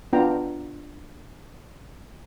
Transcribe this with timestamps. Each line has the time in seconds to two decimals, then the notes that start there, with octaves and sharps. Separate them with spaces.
0.13 B3 D4 F4 G5 A#5